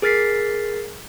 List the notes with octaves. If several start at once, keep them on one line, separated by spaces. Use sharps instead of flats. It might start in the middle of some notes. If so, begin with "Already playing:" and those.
G#4 A#4 F6 A6 B6 C7